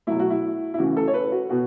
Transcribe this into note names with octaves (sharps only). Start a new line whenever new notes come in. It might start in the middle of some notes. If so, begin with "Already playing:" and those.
B2 F#3 A3 E4
F#4
E4
E4
C#3 E3 A3 F#4
A4
C#5
B4
F#4
B2 B3 F#4